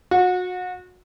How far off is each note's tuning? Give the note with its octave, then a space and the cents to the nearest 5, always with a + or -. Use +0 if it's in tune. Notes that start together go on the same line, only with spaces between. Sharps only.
F#4 -30